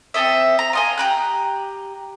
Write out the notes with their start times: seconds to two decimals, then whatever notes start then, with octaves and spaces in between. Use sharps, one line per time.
0.14 C4 A4 D#5 E5
0.59 A#5
0.73 F4 D#5 G#5
0.98 G4 A#5 F#6